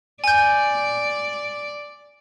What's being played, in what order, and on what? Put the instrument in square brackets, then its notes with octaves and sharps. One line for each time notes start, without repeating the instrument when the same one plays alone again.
[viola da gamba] D5 [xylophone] G#5 G6